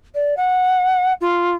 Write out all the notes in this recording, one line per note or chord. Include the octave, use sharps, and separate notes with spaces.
D5
F#5
F4